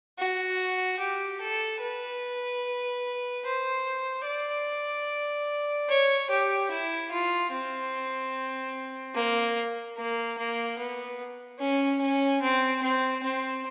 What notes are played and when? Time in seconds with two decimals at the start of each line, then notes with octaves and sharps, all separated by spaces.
0.18 F#4
1.00 G4
1.41 A4
1.81 B4
3.45 C5
4.26 D5
5.89 C#5
6.30 G4
6.71 E4
7.11 F4
7.52 C4
9.15 A#3
9.96 A#3
10.38 A#3
10.78 B3
11.59 C#4
12.01 C#4
12.42 C4
12.82 C4
13.23 C4